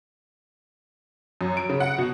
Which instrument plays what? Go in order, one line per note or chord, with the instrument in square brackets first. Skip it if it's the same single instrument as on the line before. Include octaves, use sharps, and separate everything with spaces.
[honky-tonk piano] F#2
D7
C#3
F#5
B2